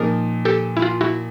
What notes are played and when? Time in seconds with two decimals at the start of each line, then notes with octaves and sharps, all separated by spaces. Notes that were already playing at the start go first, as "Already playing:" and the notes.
Already playing: A#2 F3 A#3 D#4 G#4 A#4
0.45 G4 A4
0.77 E4
0.82 F4
1.01 E4 F#4